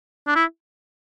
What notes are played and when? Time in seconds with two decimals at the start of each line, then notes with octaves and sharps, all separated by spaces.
0.27 D4
0.36 E4